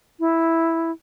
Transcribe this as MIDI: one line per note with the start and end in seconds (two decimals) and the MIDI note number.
0.20 0.91 64